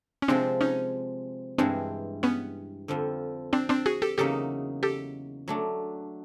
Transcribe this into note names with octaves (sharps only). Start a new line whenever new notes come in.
C#4
C3 F3 G#3 C4 D4
C#4 D#4
G2 E3 G#3 C4 D4
B3 C#4
F2 D3 F3
C4 D4
C4 D4
F#4 G#4
G4 A4
E2 C#3 F#3 A#3 D#4 G4 A4
G4 A4
F#3 A3 D4